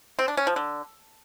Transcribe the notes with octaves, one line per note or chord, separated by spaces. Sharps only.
C4
D4
C#4
F3
D3